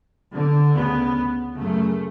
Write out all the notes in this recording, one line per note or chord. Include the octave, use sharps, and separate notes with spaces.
D3
D2 C#3 B3
F#2 C#3 A3